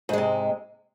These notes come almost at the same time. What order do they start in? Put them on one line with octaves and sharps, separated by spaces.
G#2 G#3 C3